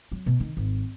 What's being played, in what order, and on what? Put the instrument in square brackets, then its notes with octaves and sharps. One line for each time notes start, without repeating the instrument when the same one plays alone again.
[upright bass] F#3
B2
D#3
G#1